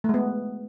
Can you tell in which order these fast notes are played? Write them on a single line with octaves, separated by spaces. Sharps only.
A3 G#3 B3